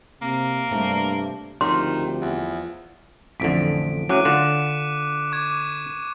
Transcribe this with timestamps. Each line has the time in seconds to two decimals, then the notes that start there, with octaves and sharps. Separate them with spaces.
0.22 C3 A#3
0.71 G2 C3 A3 C4
1.61 D2 D#3 F3 C4 G4 C6
2.21 E2
3.40 A1 F2 D3 B6 D7
4.09 A2 F#3 C#4 D6 F#6 D#7
4.25 D3 F4 F#5 D6 C#7 E7
5.32 C#6 D6 G#6